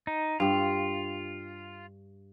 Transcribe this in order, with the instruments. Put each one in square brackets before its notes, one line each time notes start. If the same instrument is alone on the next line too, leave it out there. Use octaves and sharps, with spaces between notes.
[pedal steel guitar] D#4
[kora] G2 G4 [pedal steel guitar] F4